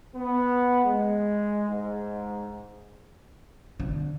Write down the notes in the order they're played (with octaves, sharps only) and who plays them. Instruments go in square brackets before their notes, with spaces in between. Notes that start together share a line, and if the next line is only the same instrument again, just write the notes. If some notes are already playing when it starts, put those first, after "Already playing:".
[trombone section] B3
G#3
G#2
[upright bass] D3